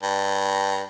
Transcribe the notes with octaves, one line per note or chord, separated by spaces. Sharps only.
G2